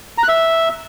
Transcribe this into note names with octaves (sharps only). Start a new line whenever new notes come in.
A#5
F#6
E5